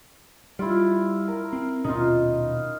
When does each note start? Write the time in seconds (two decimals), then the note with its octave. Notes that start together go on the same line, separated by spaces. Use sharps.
0.59 G3 E4 F4
1.28 A#4
1.53 C4
1.84 D#1 B2 C#4 D#4 F4